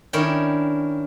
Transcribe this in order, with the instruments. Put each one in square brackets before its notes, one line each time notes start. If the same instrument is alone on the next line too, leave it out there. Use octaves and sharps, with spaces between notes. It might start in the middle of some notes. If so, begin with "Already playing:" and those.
[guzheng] D#3 C#4 D4 E4 C#5 G5